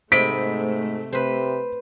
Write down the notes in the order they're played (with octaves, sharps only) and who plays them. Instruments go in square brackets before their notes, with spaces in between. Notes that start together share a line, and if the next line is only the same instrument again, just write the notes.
[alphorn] G#2 [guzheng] C3 D#5 B5 [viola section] A3 [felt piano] B6 D7
[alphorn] C3 [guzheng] B4 C5